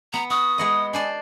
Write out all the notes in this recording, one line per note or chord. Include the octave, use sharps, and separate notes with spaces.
B3 A#5
F#4 D#6
G#3 B3 D#5
D4 C5 D5 G#5